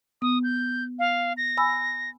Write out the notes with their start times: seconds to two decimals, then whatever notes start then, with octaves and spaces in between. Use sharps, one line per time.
0.22 B3 D#6
0.44 G6
0.99 F5
1.37 A#6
1.57 G#5 B5 E6